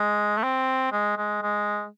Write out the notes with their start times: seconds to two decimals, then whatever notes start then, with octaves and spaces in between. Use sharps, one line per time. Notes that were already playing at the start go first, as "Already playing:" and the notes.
Already playing: G#3
0.37 A3
0.43 C4
0.92 G#3
1.17 G#3
1.42 G#3